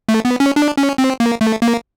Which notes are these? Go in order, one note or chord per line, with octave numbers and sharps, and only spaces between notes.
A3
B3
C#4
D4
C#4
C4
A#3
A3
A#3